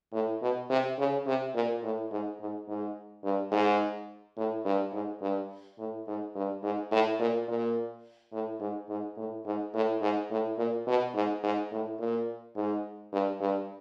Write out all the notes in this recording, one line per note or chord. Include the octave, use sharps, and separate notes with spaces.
A2
B2
C3
C#3
C3
A#2
A2
G#2
G#2
G#2
G2
G#2
A2
G2
G#2
G2
A2
G#2
G2
G#2
A2
A#2
A#2
A2
G#2
G#2
A2
G#2
A2
G#2
A2
A#2
B2
G#2
G#2
A2
A#2
G#2
G2
G2